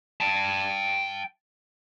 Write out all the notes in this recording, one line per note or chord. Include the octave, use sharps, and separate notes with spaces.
G5 A5